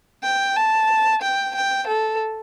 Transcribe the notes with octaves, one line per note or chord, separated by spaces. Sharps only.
G5
A5
G5
G5
A4